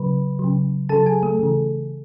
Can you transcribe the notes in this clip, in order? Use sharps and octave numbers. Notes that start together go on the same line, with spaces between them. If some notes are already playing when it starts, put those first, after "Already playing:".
Already playing: C#3 F#3 B4 B5
C#3 F#3
C#3 F#3 A4 A5
G#4 G#5
A3 A4
C#3 E3